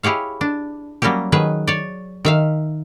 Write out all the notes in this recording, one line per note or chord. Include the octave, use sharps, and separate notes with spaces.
E4 G4 G#4 C#5 F5
D4
F#3 G3 A#3 C#4 G4
D#3 F#3 G#4 B4
C#5 D5
D#3 E5 F5